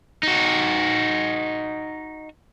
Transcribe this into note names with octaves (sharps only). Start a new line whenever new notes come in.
D#4 F#4